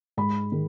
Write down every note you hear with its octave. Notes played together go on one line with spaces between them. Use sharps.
G#2 B5
D#3 G#3